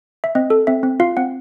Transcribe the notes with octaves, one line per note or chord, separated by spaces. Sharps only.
E5
C4 D#5
A4
C4 E5
C4
F4 F5
C4 F#5